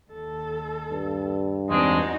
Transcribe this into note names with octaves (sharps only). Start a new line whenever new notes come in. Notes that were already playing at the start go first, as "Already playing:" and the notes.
D#2 A4
G2
E2 G#3 C4 D4 D#4 F#4